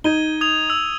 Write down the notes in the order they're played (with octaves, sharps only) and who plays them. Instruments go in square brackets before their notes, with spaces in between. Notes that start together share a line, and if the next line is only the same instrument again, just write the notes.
[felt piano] D#4 [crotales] G#6 D#7 G7
[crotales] D#6 G#6 F7
E6